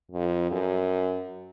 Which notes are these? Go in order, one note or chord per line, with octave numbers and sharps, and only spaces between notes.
F2
F#2